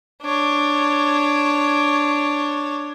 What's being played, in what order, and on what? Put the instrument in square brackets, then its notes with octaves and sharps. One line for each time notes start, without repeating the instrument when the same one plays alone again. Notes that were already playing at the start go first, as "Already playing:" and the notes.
[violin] D4 C#5